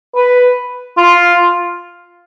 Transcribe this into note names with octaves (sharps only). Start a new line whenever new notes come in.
B4
F4